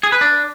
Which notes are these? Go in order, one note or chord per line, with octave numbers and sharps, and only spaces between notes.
G#4
B4
D4